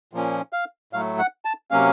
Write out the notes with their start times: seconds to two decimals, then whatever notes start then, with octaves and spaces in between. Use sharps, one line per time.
0.13 A#2 F3 A#3 C#4
0.53 F5
0.93 A2 F#3 A3 F5
1.19 F#5
1.45 A5
1.71 C3 F#3 A#3 C#4 F5